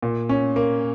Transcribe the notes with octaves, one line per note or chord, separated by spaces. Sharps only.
A#2
C#4
A#3